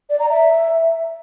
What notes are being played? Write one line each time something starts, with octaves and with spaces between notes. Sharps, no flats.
D5
A#5
E5